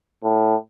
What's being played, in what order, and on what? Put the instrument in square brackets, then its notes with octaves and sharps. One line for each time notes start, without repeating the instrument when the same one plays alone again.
[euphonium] A2